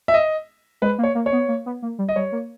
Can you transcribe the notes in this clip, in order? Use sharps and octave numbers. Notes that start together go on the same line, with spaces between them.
E5
D#5
G#3 B4
A#3
C#5
A#3
C#5
B3
A#3
B3
A#3
G3
D#5
G3 C#5
A#3